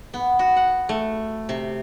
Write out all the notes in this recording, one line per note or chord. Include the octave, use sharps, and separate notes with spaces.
B3
F#4
F#5
A3
C3